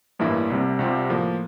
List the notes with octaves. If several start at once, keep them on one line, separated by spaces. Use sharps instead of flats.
A1 G2 E3 A#3 E4
C2 C3 G3
C2 C3 G3 C4 F4
A2 F3 A#3